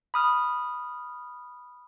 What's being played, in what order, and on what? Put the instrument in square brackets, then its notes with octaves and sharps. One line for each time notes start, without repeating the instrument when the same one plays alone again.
[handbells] B5 D#6 F6